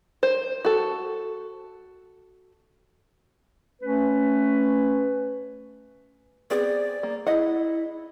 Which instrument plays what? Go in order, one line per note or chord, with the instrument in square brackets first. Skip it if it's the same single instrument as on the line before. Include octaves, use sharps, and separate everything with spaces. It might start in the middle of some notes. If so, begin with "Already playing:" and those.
[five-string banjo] C5
F#4 A4
[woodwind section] A3 C#4 B4
[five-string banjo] B3 C4 G#4 [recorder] D5
[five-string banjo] A#3
[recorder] E4 [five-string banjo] G#4 D#5 F#5